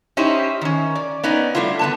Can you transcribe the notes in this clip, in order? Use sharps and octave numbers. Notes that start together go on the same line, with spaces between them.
C#4 D#4 E4 G4 C5
D#3 C#4
D5
B3 C#4 D#4 D5
G3 A3 D4 E4 F4
D3 B3 A5